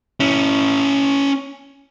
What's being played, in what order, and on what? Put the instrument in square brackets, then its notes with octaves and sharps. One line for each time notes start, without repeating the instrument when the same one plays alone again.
[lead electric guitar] C#4 E4